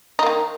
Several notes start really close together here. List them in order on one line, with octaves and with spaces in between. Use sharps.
D#4 A#3 D#3